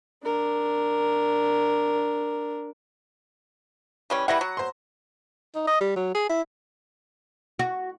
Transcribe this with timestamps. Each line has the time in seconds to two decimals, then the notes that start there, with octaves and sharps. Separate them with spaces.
0.23 D4 A#4
4.10 E3 G3 C#4
4.28 E3 G3 E4 F#5 A#6
4.41 F#3
4.57 C5 C6
5.55 D#4
5.67 D#5
5.81 G3
5.96 F#3
6.15 G#4
6.29 E4
7.59 F#4